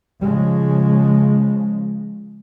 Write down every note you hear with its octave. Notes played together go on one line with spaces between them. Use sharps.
C#3 F3 G#3